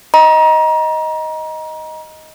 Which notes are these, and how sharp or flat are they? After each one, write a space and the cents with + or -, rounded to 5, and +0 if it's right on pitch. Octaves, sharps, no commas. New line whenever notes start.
D#5 +10 A#5 +30